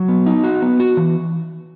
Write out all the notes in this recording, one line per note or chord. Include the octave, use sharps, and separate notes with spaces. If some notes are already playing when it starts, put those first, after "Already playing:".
Already playing: F#3
B3
D#4
F#4
B3
F#4
E3